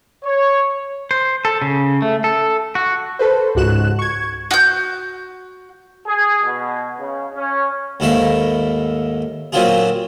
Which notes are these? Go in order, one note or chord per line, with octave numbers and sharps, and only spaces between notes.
C#5
C5
A4
C#3
A3
A4
F#4
A4 B4 C5
C#2 G#2 F#4 F#6 E7
C#6 G#6
F#4 G6
G#4
B2
C#3
C#4
D#2 G#2 A3 E4 E5 F5
A#2 D3 F#3 C4 F4 G#4